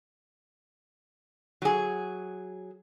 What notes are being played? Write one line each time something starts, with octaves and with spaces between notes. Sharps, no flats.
F#3 G#4